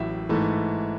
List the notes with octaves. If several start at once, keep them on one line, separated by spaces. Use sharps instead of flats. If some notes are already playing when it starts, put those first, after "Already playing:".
Already playing: A1 A2 F#3 E5
G#2 E3 A3